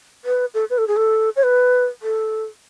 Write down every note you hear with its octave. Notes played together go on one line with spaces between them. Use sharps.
B4
A4
B4
A4
G#4
A4
C#5
B4
A4